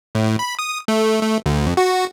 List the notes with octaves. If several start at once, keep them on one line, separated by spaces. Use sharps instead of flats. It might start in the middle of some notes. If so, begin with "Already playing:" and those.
A2
B5
D#6
A3
A3
D2
F2
F#4